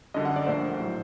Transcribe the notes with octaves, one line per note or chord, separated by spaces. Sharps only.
F#2 D3 G3 D#5
F#5
D5
A#1 A#2 A3 C5
A2 F#3